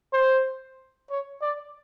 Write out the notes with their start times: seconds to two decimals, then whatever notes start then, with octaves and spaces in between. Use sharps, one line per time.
0.13 C5
1.10 C#5
1.42 D5